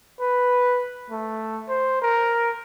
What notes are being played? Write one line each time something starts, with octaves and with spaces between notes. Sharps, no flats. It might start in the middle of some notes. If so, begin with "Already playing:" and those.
B4
A3
C5
A#4